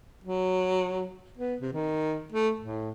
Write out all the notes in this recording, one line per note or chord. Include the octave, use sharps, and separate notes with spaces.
F#3
B3
C3
D#3
A3
A2